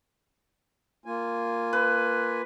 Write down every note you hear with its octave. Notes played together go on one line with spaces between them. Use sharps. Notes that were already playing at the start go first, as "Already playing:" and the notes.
A#3 F4 G#5
B4